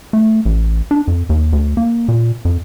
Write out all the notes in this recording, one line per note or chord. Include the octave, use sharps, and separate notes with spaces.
A3
A1
D4
F2
D#2
D2
A#3
A#2
F2